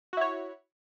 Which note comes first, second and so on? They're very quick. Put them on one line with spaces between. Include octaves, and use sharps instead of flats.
F#4 E4 C#5